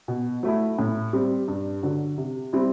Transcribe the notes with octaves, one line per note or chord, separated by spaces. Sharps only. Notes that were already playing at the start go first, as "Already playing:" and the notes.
B2
F#3 A3 E4
A2
G3 C4
G2
D3 F#3
C3
G3 C4 E4